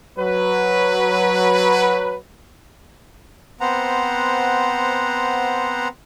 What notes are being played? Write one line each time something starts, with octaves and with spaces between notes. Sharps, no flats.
F#3 B4
B3 C4 C5 F#5 A#5